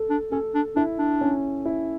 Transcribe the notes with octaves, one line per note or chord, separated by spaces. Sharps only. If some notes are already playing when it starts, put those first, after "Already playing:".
Already playing: A4
D4
C#4 A4
D4
D4 E4
D4
C#4
E4